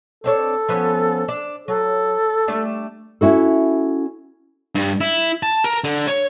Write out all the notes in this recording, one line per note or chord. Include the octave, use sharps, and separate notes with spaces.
C4 D4 A4 C#5
F3 B3 C#4
D4
F#3 A4
G3 A3 D4
C#4 E4 F#4 A4
G2
E4
A5
A#4
D3
C#5